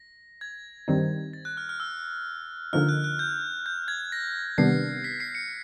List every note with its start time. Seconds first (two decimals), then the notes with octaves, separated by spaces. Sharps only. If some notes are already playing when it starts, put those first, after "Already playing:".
Already playing: A#6
0.41 G#6
0.88 G2 D#3 G3 C4 D#4
1.33 A6
1.45 F#6
1.57 F6
1.69 F6
1.80 E6
2.73 D3 F3 A#3 D#4 F6
2.89 F#6
3.04 F#6
3.19 G6
3.66 G6
3.88 G#6
4.12 A#6
4.58 C3 D#3 G3 B3 D4 C7
5.04 B6
5.20 C7
5.35 C#7